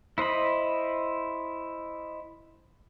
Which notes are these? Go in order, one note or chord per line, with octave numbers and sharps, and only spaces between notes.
E4 C5 D#5 B5